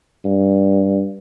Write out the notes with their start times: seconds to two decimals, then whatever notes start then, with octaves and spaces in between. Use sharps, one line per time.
0.25 G2